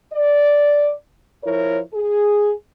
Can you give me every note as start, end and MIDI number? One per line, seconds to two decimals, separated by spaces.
0.13 0.91 74
1.44 1.79 53
1.44 1.79 64
1.44 1.79 70
1.44 1.79 73
1.94 2.52 68